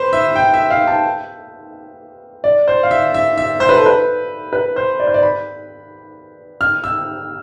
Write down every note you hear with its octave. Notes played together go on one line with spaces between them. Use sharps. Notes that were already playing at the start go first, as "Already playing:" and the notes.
Already playing: B4 C5
E5
G5
E5
F5
A5
D5
C5
F5
E5
E5
E5
C5
B4
A4
B4
B4
C5
D5
C5
D5
B5
F6
E6